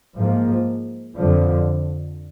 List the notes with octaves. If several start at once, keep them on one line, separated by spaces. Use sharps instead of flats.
G#2 F3 A#3
F2 D3 F3